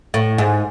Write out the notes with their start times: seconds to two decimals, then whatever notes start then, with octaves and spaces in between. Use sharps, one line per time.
0.14 A2
0.38 G#2